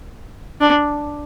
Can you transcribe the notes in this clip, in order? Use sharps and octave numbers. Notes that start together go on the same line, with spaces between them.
D4